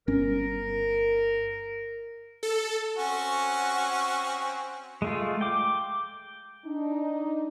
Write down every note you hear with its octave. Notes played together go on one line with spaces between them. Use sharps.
G1 C#4 A#4
A4
C4 C#4 F#4
G#3 A3 F4
G5 D6
D4 D#4